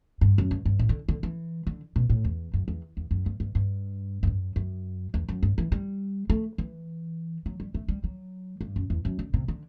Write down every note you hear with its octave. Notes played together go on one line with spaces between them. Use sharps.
G2
F#2
G2
G2
A2
D3
D3
E3
D3
B2
A2
E2
F#2
E2
E2
F#2
G2
G2
G2
G2
F#2
F#2
E2
F#2
G2
E3
G3
A3
E3
F#3
G3
A3
G3
F#3
G2
F#2
E2
F#2
D3
C3
D3